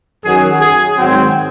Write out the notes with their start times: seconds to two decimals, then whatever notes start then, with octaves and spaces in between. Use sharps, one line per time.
0.23 F#2 D#3 F#3 G#4
0.60 G#4
0.97 G#2 D#3 F#3 C4